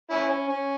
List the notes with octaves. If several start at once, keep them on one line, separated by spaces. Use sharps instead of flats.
C#4 E4
C#4
C#4